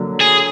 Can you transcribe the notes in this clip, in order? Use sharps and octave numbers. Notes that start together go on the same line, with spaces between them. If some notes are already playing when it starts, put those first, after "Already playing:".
Already playing: D3 F#3 A#3 D4
G#4